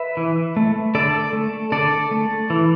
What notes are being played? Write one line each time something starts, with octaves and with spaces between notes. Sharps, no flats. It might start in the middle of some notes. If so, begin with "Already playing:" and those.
Already playing: B4 E5
E3
A3
D3 A4 D5
A3
D3 A4 D5
A3
E3